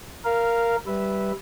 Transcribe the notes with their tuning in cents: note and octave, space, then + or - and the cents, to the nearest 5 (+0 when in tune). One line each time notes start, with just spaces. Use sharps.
A#4 +0 F5 -10
G3 -5 B4 +0 E5 -10